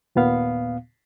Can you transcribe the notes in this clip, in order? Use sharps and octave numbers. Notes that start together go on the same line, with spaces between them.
D#2 A#2 B3 F5